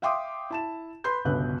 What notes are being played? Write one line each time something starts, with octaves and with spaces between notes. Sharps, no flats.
E5 F5 G5 C6 D6 D#6
E4 A5 E7
B4 B5 C6 G6
G1 C#2 G2 B2 B4 F#6